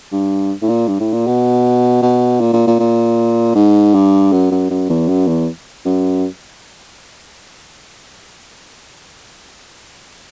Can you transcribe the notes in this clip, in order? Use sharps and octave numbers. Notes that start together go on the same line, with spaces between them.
G2
A2
A#2
G2
A2
A#2
B2
B2
A#2
A#2
A#2
A#2
G#2
G2
F#2
F#2
F#2
E2
F#2
E2
F#2